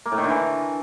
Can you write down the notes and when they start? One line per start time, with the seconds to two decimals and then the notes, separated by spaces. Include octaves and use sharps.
0.06 A#3
0.12 A2
0.18 D#3
0.24 D3
0.30 E3